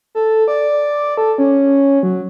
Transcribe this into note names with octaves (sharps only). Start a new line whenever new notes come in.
A4
D5
A4
C#4
F#3